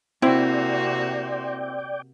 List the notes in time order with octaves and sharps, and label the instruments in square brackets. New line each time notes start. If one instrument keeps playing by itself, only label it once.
[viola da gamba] C3 A#3 F#4 [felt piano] C4 [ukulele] E4 [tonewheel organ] D5 G5